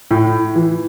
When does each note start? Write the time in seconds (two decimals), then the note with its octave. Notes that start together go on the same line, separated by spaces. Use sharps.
0.11 A2
0.55 E3